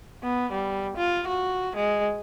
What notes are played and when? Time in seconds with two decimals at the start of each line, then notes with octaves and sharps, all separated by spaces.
0.23 B3
0.52 G3
0.97 F4
1.28 F#4
1.76 G#3